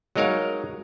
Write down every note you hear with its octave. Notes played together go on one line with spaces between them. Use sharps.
F#3 G#3 D#4 A#4 C#5 F5